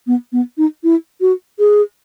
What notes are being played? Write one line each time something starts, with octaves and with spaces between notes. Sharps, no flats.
B3
B3
D#4
E4
F#4
G#4